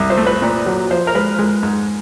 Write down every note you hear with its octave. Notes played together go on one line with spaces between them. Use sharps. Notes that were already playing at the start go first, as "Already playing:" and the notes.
Already playing: C2
C5
A3
B4
A#2
F#3
F3 C5
A#4
G#3 B4
G#3
G#2